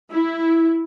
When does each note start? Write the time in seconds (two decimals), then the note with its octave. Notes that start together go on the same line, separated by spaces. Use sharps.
0.11 E4